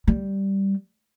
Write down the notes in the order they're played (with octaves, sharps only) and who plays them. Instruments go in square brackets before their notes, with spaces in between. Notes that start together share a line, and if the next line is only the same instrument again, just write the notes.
[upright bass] G3